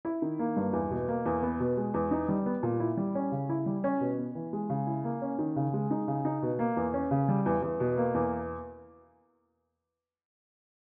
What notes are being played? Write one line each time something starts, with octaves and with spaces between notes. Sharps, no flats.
E4
D#3
A#3
G2
E2
B2
A#3
E2
B3
B2
G#3
E2
D#4
G3
B3
A#2
E4
G3
C#4
C#3
E4
G3
C#4
B2
B3
E3
G#3
C#3
E4
A#3
C#4
D#3
C#3
G#3
D#4
C#3
D#4
B2
A#3
E2
C#4
C#3
G3
E2
E2
B2
A#3
E2